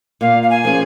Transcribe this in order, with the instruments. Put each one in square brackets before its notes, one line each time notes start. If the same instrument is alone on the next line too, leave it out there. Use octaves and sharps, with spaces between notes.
[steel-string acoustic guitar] A#2 [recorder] F5
[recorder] F5
G#5
[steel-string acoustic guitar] F3 A#3 C#4 G#4